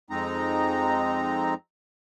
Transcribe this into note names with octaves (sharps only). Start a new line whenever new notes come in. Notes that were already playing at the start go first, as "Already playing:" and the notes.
F2 G#3 C4 D#4 A#5